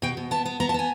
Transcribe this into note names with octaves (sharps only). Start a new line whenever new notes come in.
B2 G5
B2
B3 A5
B3
B3 A#5
A5
B3 G#5